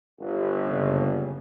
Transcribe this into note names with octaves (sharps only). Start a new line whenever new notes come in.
G1
F#1 C#3